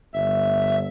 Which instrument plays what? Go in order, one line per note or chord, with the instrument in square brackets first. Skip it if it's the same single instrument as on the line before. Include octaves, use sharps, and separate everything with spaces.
[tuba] G1 [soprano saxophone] E5